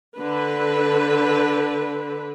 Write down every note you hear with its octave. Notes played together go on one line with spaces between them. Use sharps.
D3 B4